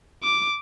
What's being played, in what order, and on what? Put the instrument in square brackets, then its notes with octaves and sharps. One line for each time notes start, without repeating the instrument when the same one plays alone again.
[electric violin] D6